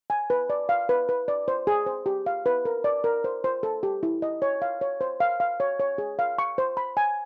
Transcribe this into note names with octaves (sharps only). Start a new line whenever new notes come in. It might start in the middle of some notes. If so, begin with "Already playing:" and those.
G#5
B4
D5
F5
B4
B4
D5
C5
G#4
C5
G4
F5
B4
A#4
D5
A#4
C5
C5
A4
G4
E4
D#5
C#5
F5
C#5
C5
F5
F5
C#5
C#5
G#4
F5
C#6
C5
B5
G#5